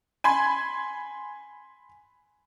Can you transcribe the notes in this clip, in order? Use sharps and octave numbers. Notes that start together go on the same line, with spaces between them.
G#5 B5 C6 G#6